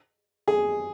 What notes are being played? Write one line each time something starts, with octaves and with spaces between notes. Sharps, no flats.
G#4